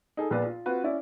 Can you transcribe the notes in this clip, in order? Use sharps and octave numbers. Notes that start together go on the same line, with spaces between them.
D#4 G#4 A4
A#1 A#2 B3 F4 B4 D5
F4
C4 F4 F#4 B4
C#4 E4 D5